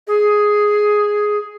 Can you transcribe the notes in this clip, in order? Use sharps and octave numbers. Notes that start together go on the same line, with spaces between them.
G#4